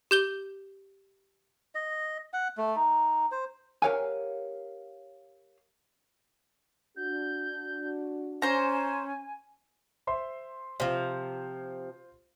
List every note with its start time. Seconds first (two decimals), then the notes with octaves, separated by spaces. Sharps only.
0.11 G4 G6 G7
1.75 D#5
2.33 F#5
2.57 A3
2.76 D#4
3.32 C5
3.82 G4 A#4 C#5 F5 F#5 G#5
6.97 D4 F#4 G6
8.42 C#4 C5 G#5 A#5
10.07 C5 E5 C6
10.80 C3 F3 F4 C5